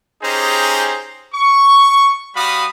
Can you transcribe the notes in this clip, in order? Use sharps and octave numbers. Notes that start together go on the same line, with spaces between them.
C#4 D#4 G4 G#4 C5 A#5
C#6
G3 F#4 F5 B5 D#6